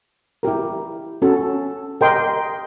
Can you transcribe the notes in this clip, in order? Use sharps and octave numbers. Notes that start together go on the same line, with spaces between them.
E4 G4 A#4
C#4 F#4 A4
G4 A#4 D#5 G5 C6